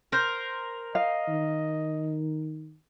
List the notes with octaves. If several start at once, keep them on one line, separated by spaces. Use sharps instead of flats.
A#4 C5
D#5 F5
D#3